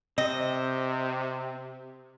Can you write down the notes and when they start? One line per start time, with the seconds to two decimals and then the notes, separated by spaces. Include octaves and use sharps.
0.18 C3 C4 D#5